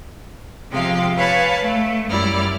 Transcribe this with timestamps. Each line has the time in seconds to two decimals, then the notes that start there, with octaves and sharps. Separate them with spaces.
0.72 C3 F3 G#3 F5 G5
1.17 B4 C#5 F5 G#5 A5 B5
1.62 A3
2.09 F#2 G3 E4 D5 F6